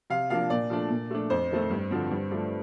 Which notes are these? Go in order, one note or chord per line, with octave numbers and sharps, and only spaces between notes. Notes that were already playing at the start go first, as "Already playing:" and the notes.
C3 F5
F3 A#3 D4 F5
A#2 D5
F3 A3 D4
A#2
A3 D4
F2 C5
D#3 A3 C4
G2
D3 F3 C4
G2
F3 A3 D4